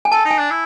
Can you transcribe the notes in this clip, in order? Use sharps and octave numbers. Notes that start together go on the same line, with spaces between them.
G#5
A4 A5
D#4
G#5
D4
E4